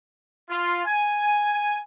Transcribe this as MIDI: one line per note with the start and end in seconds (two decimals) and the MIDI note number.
0.49 0.82 65
0.86 1.80 80